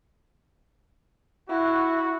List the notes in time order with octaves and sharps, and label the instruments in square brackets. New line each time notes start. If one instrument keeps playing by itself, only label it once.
[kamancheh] E4 [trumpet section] F#4